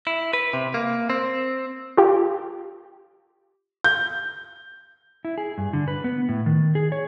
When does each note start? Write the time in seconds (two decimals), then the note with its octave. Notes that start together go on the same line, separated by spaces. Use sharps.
0.07 E4
0.33 B4
0.53 C3
0.74 A#3
1.10 C4
1.97 F4 G4
3.84 G6
5.25 E4
5.38 G#4
5.58 G2
5.73 D3
5.88 B4
6.04 B3
6.29 A2
6.46 D#3
6.75 G#4
6.92 C#5